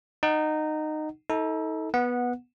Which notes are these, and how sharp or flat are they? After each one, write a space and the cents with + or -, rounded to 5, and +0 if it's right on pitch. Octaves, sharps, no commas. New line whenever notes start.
D#4 -15 F#5 +15
D#4 +40 A4 +0
B3 -10 F#5 -15